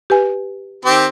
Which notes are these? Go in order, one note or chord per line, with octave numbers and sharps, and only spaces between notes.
G4 B4 G#5
D#3 C4 G4